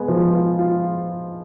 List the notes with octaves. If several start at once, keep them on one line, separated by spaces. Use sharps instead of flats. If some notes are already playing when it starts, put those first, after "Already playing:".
Already playing: G#3 B3
F3
F4
F4